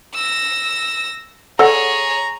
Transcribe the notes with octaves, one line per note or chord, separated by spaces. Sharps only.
E6 A#6
G#4 A4 C#5 D5 F#5 A#5